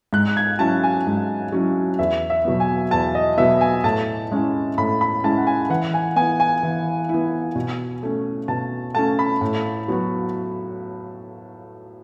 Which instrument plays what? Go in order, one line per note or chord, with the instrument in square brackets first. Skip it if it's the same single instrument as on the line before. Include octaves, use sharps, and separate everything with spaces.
[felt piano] G#2 [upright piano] F#6
[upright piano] G#6
[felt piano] F#3 C#4 E4 [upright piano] A5
[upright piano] G#5
[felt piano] G#2
F#3 C#4 E4
[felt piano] E2 [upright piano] E5
[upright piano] E5
[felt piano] B2 F#3 B3
[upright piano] G#5
[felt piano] E2 [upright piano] A5
[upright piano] D#5
[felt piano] B2 F#3 B3 [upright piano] E5
[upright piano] G#5
[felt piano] A2 [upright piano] A5
[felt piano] G#3 C#4 E4
[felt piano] A2 [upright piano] B5
[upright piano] B5
[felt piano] G#3 C#4 E4 [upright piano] A5
[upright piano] F#5
G#5
[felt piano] E3 [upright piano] F#5
[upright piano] G#5
[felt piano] B3 E4 [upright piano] G#5
[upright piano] G#5
[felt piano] E3
B3 E4
B2
A3 C#4
[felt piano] B2 [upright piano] A5
[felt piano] A3 C#4 [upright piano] A5
[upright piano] B5
[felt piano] A2
F#3 B3 F#4